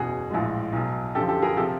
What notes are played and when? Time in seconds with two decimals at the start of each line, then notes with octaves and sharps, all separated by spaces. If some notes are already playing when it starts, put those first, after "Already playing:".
Already playing: F#1 E2 B2 F#4 G#4
0.31 A#1 A2 F3 G#3
0.73 B1 B2 F#3
1.15 F#2 D3 F3 G4 A4
1.28 G4 A4
1.42 G#4 A#4
1.56 C3 F3 G4 A4